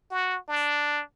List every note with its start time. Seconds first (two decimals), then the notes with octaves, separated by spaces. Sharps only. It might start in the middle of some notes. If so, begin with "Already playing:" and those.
0.11 F#4
0.48 D4